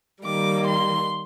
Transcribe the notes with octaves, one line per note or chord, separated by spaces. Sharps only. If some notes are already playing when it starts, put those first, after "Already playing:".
D#3 G3 A#3 D6
C6